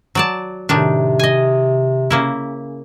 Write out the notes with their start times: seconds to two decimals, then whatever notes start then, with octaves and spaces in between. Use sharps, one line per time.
0.15 F#3 D5 A5
0.69 A2 C3 D#3 D4
1.19 D#5 G#5
2.11 C#3 A#3 E4